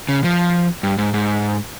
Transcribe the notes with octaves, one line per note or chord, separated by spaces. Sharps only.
C#3
F3
G2
G#2
G#2